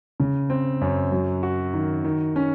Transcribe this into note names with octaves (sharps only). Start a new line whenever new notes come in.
C#3
C4
F#2
F#3
F#4
D#3
D#3
C#4